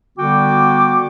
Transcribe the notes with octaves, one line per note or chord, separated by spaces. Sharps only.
D3 G3 B3 F#4 G5 D6